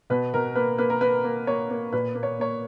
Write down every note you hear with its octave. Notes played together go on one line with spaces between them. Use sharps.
B2 B4
B2 A#4
A#3 B4
A#3 B4
A#4
A#3 B4
A#3
A#3 C#5
A#3
A#2 B4
A#3
C#5
A#3 C#5